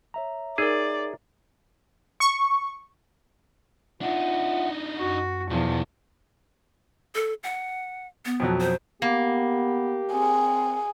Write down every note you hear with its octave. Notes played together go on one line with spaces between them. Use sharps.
C#5 E5 A#5
D#4 G#4 A#4 D5
C#6
D4 D#4 F4 E5 F#5
F#2 F#4
B1 E2 B2 F3
A4
F#5
B3
F2 B2 F#3
C5
A#3 B3 G4
C4 G#4